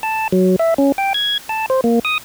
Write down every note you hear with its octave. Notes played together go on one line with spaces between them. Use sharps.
A5
F#3
E5
C#4
G5
G#6
A5
C5
A#3
D#6